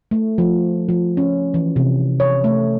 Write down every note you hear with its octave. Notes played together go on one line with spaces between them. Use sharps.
A3
F3
F3
C#4
E3
C3
C#5
A3